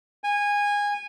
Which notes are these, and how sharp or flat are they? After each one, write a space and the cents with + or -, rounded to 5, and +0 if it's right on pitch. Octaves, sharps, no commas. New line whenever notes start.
G#5 -20